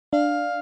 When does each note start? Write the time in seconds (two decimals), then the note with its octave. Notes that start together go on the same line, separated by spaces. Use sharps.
0.13 D4 F5